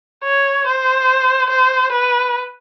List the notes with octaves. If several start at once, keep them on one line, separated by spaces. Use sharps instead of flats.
C#5
C5
C5
B4